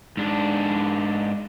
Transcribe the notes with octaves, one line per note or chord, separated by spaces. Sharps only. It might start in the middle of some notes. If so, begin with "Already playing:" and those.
G#2 D4